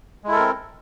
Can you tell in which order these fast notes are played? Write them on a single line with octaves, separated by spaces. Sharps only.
G#3 E4 A4 A#4 C4